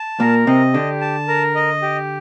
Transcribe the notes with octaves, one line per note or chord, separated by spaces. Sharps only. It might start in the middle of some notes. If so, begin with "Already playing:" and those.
Already playing: A5
A#2 A#3 A#4
C3 C4 D#5
D3 D4 G4
A5
A#4
D#5
G4